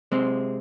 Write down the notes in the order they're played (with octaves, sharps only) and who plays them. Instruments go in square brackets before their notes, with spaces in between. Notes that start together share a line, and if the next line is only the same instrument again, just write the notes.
[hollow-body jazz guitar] C3 G#3 C4